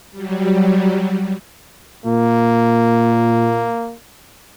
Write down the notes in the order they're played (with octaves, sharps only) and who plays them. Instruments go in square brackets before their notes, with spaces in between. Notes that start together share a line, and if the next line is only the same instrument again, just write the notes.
[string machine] F#3 G3
[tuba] A#2 [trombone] A#3